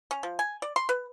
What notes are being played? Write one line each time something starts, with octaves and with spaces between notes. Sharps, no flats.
C#4
F3
G#5
D5
C6
B4